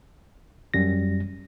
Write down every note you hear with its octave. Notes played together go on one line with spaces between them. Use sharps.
F#2 G3 A#6